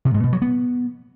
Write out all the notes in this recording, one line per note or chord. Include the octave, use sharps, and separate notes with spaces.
C3
G#2
B2
F#3
B3